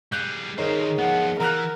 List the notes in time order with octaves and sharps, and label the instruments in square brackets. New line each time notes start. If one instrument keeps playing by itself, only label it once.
[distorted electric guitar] G3 G#4 [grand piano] F#6 G6
[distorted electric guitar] D#3 C5 [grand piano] D#4 C#5 [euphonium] G#4 [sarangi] A#4
[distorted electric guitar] F3 B3 [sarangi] F#5
[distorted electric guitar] E3 [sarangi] A#4 [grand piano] A#5 F6 F#6